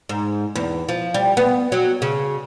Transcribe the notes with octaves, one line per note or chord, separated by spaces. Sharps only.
G#2
E2
F3
G3
B3
F#3
C#3